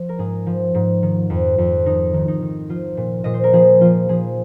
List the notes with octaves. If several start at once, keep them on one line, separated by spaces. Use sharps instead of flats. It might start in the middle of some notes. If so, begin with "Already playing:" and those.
Already playing: F3
A#4
G#2 G#4
F3
G#2
D#3
F2
F2
D#3 D#4
D#3
D#4
D#3
F3 F4
A#2
A#2 D#5
C5
A#4
F3 G#4
F3 F4
F3 G#4